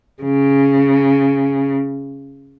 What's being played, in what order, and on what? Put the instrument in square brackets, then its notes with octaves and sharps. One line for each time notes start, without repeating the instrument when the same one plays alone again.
[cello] C#3